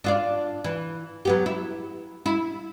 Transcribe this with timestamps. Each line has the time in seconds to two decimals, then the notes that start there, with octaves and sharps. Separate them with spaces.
0.04 D4 F4 D5
0.64 E3
1.25 F#3 B3 G4
1.46 E4
2.26 E4